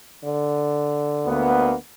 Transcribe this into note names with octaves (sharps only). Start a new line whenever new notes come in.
D3
D2 A#3 B3